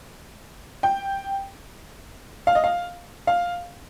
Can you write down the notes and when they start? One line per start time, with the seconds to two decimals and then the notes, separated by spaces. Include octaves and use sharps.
0.83 G5
2.47 F5
2.55 D#5
2.64 F5
3.27 F5